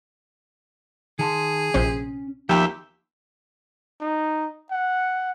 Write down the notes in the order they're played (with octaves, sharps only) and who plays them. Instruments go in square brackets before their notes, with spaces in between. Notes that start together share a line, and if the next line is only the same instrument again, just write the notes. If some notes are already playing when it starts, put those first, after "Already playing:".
[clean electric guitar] D#3 A5 C6 [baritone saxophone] G#4
[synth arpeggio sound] A#1 C3 C5 [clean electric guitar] C#4
[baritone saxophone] D#2 [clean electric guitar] F3 B3 [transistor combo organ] G4 E5 [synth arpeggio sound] F5 G5 F6
[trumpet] D#4
F#5